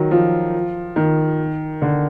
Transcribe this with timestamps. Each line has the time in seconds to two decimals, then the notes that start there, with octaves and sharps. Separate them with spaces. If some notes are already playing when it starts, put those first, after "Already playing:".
Already playing: D#3 F#3
0.11 F3
0.96 D#3
1.82 D3